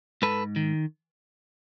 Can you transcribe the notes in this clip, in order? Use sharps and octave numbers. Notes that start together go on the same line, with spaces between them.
G#2 A4 B4
D#3